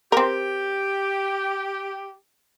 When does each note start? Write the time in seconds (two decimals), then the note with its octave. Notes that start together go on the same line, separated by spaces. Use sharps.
0.12 C4 G4 A#4